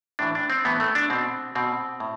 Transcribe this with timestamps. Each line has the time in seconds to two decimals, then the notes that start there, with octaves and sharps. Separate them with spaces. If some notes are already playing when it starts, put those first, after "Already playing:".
0.19 A2 E3 D4
0.35 D4
0.50 C4
0.65 A2 E3 B3
0.80 A3
0.95 D4
1.10 B2 C4
1.55 B2 C4
2.00 A2